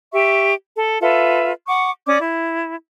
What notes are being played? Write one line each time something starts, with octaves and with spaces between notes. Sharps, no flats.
G4 E5 C#6
A4
F4 A4 B4 E5
F#5 C#6 D6
C#4 D5 D6 D#6
E4